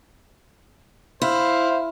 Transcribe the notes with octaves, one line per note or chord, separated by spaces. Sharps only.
E4 C5 F5